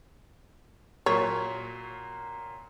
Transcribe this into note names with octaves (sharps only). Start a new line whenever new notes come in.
A#2 F#3 A#3 C#5